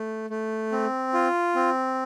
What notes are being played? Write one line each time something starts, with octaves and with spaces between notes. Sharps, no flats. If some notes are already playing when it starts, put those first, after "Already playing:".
Already playing: A3
A3
C4
F4
C4